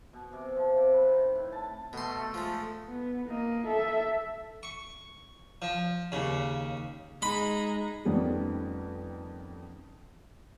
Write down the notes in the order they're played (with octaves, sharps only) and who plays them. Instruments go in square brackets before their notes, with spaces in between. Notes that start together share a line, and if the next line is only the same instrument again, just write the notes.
[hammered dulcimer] B2
C3
F3
C3
B4
D#3
A2
A5
[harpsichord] B2 C6 [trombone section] A3
[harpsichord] F3 G#3
[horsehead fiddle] B3
A#3 D#5
A4 E5
[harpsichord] C#6
F3
D#2 C#3
[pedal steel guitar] G#3 [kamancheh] D#4 [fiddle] G#4 [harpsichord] B5
[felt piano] F2 D#3 G3 A3 B3 C#4